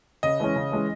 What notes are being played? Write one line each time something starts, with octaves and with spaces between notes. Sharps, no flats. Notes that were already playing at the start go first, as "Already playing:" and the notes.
C#3 D#5
E3 G#3 C#4
C#3
E3 G#3 C#4